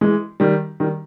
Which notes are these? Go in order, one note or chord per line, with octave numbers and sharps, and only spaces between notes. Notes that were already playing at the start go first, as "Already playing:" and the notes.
E3 G#3
D#3 G3
D#3 G3